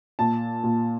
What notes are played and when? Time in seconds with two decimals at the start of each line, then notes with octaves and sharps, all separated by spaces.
0.19 A#2 A5
0.63 A#2